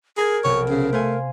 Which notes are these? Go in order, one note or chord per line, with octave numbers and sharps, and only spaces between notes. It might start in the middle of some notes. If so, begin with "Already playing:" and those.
G#4 A#4 A#5 G#6
B1 C3 C#5
C#3
A3 C5 F5 G#5